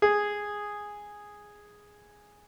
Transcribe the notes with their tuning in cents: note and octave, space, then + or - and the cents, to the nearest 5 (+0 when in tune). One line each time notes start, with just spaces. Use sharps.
G#4 -5